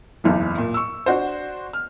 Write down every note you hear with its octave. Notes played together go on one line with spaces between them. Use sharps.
F#1 B1 E2 E3
A#2
C#6 E6
D4 F#4 C5
F6